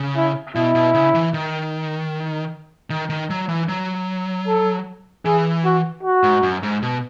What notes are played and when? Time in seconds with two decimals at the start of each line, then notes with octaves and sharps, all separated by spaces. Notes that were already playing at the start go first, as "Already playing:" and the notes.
Already playing: C#3
0.17 E4
0.55 B2 E4
0.75 B2
0.94 C#3
1.14 E3
1.34 D#3
2.90 D#3
3.10 D#3
3.30 F#3
3.49 E3
3.69 F#3
4.48 A4
5.25 E3 G#4
5.65 F#4
6.04 F#4
6.23 G#2
6.43 F#2
6.63 G#2
6.82 B2